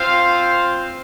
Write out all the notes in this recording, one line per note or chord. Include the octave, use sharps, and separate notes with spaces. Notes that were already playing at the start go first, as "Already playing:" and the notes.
Already playing: C4 F4 C5 F5